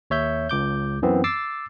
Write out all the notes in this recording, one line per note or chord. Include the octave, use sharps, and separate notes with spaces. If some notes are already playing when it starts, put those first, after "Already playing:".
D#2 C#5 E5 G6
C#2 D6 G6
F#2 E3 B3 C4
D6 E6 A6 C7